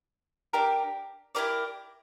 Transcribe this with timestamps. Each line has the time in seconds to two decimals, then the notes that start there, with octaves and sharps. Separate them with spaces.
0.53 D4 G4 A#4
1.35 E4 G4 A#4 D5